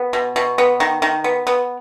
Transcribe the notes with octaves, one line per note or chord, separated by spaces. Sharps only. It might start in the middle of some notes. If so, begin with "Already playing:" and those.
Already playing: B3
B2
B2
B3
D#3
D#3
B3
B3